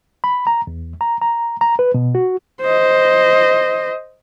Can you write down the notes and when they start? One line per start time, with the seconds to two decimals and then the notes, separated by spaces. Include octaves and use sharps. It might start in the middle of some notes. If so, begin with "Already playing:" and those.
0.24 B5
0.47 A#5
0.67 E2
1.01 A#5
1.21 A#5
1.61 A#5
1.79 B4
1.94 B2
2.15 F#4
2.61 C5 D#5